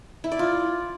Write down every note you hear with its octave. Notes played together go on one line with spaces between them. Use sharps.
E4
D5
F4